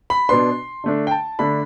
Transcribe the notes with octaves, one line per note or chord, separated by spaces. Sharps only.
B5
B2 B3 D4 C6
D3 A3 D4
G5
A5
D3 A3 D4 B5